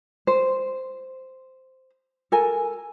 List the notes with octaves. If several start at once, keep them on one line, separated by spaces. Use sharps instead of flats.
C5
A4 A#4 G#5